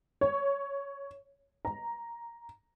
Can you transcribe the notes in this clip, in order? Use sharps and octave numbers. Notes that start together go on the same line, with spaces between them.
C#5
A#5